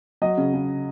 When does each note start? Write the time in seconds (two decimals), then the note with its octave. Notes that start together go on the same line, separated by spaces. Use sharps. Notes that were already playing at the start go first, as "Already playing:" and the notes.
0.22 F#3 D#5
0.37 C#3
0.53 C#3